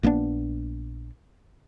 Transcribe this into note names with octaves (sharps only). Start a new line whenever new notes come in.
A#1 A#3 B3 D4